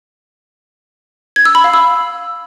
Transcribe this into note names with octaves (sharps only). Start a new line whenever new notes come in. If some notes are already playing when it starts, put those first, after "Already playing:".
G#6
E6
B5
F5
E6